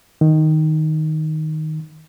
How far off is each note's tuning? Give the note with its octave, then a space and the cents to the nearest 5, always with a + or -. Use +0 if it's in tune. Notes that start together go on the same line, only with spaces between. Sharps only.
D#3 +5